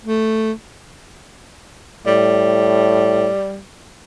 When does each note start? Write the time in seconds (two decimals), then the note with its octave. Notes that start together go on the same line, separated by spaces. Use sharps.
0.04 A3
2.06 A2 G3